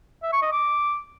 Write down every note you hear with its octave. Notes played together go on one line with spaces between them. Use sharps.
E5
C#6
D#5
D6